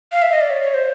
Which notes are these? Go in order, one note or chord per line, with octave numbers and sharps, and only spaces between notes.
F5
E5
D#5
D5
C#5
C#5
C5